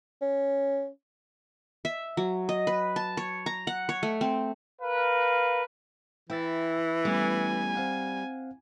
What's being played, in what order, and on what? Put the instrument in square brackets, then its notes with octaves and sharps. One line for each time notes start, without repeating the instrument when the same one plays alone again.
[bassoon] C#4
[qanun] E5
F#3
D#5
B4
A5
C#5
A#5
F#5
C#5
A3
C4
[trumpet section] A#4 B4 F5
[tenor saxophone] E3 [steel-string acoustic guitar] E4 [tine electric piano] G5 E6 A6
[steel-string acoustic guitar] G3 [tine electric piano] A3 B3 C#4 [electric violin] G#5
[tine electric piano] C4 F5 F#5